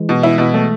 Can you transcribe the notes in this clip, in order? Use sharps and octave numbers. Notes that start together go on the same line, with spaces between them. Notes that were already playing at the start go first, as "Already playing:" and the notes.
Already playing: E3 G#3
B2
E4
B2
A3